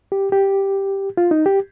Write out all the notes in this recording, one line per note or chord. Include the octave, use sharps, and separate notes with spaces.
G4
G4
F4
D#4
G4